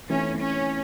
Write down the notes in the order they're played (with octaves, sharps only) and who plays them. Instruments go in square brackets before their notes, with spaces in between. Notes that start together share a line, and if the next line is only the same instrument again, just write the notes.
[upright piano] E3 A3 C4 D#4 [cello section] C#4
[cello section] C#4